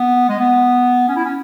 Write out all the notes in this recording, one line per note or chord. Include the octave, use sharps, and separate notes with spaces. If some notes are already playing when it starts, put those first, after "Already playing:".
Already playing: B3
G#3
B3
C#4
E4
C#4